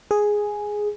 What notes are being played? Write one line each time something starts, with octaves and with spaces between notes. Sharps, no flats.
G#4